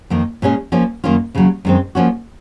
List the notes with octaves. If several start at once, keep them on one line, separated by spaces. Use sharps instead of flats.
F2 D#3 A#3
A#2 G#3 C#4 G#4
F3 A#3 C#4
F#2 D#3 A#3 C#4 F4
D#2 C#3 F#3
F#2 D#3 G#3 C4
F3 A#3 C#4 F#4